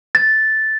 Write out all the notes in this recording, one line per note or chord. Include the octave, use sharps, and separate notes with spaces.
A6